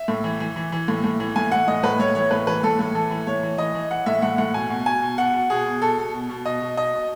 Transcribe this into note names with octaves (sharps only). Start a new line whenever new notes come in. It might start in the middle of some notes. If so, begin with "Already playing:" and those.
Already playing: E5
A2
E3
E3
E3
E3
A2
A2
E3
A2 G#5
A2 F#5
A2 D#5
A2 B4
A2 C#5
E3 C#5
A2 B4
E3 B4
A2 A4
A2
E3 A4
E3
A2 C#5
E3
E3 D#5
E3
E3 F#5
A2 E5
A2 F#5
A2 F#5
B2 G#5
B2
B2 G#5
B2
B2 F#5
B2
B2 G#4
B2
B2 A4
B2
B2
B2
B2 D#5
B2
B2 D#5
B2